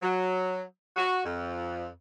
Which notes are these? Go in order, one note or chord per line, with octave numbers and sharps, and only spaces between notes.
F#3
F#4
F2